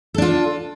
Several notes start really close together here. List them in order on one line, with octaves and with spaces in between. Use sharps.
A4 D4 F4